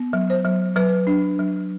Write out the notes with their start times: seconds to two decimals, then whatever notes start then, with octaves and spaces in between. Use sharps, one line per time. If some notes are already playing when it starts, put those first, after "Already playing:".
Already playing: B3
0.13 F#3
0.30 C5
0.45 F#3
0.76 F#3 B4
1.07 D4
1.39 F#3